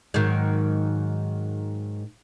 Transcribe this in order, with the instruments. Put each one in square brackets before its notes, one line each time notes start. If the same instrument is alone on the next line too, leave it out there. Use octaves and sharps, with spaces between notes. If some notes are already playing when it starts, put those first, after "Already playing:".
[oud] G#2 D#3 F#3